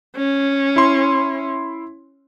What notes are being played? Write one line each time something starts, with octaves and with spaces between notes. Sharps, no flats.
C#4
E4 C6